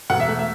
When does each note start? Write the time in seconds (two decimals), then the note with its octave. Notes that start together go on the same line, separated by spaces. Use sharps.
0.10 E1 F#5
0.20 E5
0.28 A3
0.39 E5